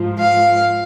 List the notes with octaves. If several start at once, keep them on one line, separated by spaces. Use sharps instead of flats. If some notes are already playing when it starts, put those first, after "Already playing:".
Already playing: G#2 F3
F5